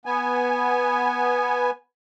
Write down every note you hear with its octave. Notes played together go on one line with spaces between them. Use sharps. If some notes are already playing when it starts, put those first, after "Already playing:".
B3 G#5